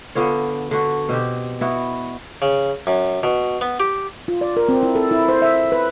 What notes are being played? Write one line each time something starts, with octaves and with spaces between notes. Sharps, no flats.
D3 B3 F4 C#5
D3 F#4
B2 C4 G4
B3 E4 F#4
C#3
F#2
B2
B3
G4
F4
D5
A#4
C4
E4
A4
E4
C5
E5
B4